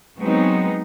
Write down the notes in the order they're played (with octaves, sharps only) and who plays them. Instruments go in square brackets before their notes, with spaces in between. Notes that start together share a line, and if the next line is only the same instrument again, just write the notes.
[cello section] F#3 G#3 B3 C4 D#4